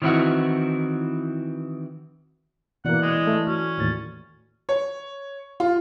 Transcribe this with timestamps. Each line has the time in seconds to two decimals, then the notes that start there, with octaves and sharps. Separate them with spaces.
0.02 D#3 E3 C4 E4 F#4
2.85 B2 E3 A#3 E4 D5 F#5
3.02 G#3
3.27 A3
3.47 C#4 F#4
3.78 D#2 A2 A6
4.69 C#5
5.60 F4